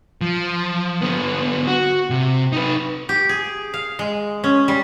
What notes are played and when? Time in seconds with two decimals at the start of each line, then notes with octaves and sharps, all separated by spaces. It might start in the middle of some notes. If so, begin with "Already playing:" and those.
0.21 F3
1.01 D3 B3
1.67 F#4
2.10 C3
2.52 D#4 B4
3.09 G4
3.29 G#4
3.74 F5
3.99 G#3
4.44 C#4
4.68 G3